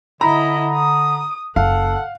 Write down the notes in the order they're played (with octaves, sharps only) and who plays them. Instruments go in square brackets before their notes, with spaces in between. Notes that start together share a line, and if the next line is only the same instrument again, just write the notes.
[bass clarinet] D3 [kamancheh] E4 D#5 [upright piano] A#5 B5
[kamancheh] D#6
[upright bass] F#1 [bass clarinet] A4 [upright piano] F5 [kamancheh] F#5